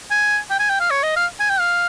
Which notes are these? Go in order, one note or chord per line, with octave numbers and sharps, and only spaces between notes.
G#5
G5
G#5
G5
F5
C#5
D#5
F5
G#5
G5
F5